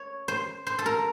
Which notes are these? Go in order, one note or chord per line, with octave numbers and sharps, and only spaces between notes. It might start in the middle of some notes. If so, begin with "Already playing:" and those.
Already playing: C#5
C5
C5
A4
A#4